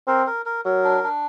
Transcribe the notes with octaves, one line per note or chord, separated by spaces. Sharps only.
C4 A#4
A#4
A#4
F#3 A#4
D4
D4